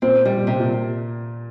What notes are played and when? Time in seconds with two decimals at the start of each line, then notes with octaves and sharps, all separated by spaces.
0.02 A#2 C4
0.25 G3
0.36 A#2
0.47 C3
0.59 A#2